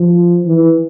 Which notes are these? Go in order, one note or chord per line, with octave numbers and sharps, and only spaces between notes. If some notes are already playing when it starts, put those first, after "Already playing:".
Already playing: F3
E3